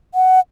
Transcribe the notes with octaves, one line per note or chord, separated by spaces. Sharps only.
F#5